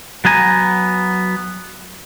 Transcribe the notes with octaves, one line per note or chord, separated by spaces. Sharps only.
F#3 B3 G#5 A#5